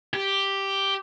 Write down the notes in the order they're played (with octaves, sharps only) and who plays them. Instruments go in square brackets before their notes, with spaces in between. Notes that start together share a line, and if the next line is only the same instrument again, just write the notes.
[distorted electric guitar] G4